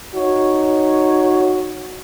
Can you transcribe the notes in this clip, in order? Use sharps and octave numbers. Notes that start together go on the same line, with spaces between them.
D#4 F#4 C#5